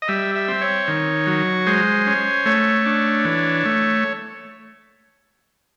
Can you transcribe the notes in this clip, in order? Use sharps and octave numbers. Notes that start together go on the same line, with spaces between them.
D#5
G3 E5
E5
C4
C#5
D#3
F#3
G#3 C5
C#4
A3 C#5
D4
E3
A3